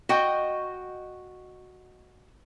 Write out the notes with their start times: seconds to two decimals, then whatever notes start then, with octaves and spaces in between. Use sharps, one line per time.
0.09 F#4 D#5 G5